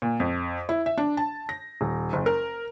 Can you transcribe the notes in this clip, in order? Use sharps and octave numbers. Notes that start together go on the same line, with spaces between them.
A#2
F2
E4
E5
D4
A5
A#6
D#1
F#1
A#4